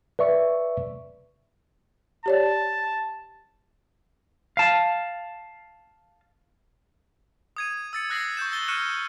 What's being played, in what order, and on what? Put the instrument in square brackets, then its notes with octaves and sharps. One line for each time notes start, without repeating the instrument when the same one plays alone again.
[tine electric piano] B4 D5 E5 C#6
[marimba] G4 C#5 D5 [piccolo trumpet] A5
[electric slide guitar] F5 A5
[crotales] D#6 G#6 D#7
E6 A6 C#7
D#6 F#6 A#6 C7 F#7
C#6 E6 G6 E7
E6 A6 G7
C#6 F6 F#6 C#7 D#7 E7